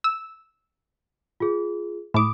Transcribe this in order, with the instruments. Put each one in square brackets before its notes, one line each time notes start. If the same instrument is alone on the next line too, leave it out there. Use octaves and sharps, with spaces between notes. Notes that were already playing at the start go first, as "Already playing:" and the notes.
[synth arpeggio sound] E6
[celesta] F4 G#4
[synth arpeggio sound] A2 D6 [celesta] B5 D#6